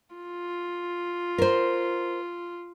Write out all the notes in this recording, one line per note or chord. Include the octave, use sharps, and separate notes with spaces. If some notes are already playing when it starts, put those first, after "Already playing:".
F4
A#4 C5